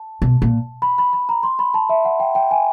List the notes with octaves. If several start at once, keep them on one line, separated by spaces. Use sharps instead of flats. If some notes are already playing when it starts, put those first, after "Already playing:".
Already playing: A5
B2
A#2
B5
B5
B5
A#5
C6
B5
A5
E5
F#5
G5
G5
G#5